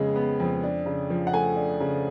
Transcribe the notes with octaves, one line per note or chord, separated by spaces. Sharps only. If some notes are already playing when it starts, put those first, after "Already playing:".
Already playing: F2 C#3 G#3 B3
B3
F2
D4
C#3
F3
F#5
A3 G#5
D4
C#3